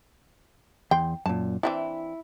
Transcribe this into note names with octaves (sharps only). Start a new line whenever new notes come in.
E2 G5 C6
F#2 A#2 A5
E3 C4 D4 E4